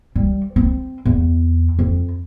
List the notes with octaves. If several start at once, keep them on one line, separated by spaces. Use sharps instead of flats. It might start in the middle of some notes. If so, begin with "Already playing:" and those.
G3
C4
E2
F2